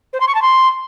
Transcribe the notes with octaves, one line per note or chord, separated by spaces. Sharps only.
C5
C6
C#6
A5
C6